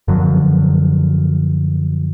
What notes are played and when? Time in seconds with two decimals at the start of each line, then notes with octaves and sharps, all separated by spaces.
0.08 F#2 D3 F3 F#3